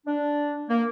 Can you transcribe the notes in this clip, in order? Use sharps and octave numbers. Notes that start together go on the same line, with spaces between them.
D4
A#3